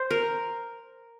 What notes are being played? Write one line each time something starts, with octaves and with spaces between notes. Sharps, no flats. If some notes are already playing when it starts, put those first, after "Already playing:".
Already playing: C5
A#4